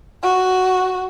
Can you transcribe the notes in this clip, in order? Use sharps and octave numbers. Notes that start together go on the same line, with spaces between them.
F#4